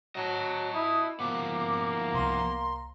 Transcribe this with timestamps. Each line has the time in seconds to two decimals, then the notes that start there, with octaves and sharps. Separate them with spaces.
0.15 F#3 D#5 A5
0.74 E4 D#6
1.20 F3 A#3 B3 D6
2.14 C2 A#5 C6